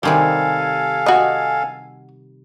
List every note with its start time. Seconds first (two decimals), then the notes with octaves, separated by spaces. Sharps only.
0.03 C3 D#3 G3 A4 F5 G#5
1.06 F#4 D#5